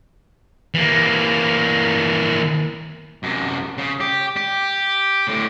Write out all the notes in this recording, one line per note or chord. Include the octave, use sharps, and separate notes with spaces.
E3 A#3
F#2 C3
C#3
G4
G4
A2 D3